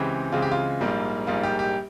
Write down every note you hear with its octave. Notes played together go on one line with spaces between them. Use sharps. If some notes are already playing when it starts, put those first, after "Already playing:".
Already playing: C#2 C#3 E3 G#3 C4 G4
C#2 C#3 E3 G#3 C4 F4
G4
F4
A#1 G#2 G3 A#3
A#1 G#2 G3 A#3 F4
G4
G4